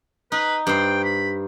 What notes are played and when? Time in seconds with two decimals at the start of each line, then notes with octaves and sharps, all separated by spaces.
0.32 D#4 B4
0.67 G2 C5 G5
1.04 B5